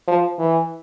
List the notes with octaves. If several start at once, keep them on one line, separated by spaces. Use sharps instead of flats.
F3
E3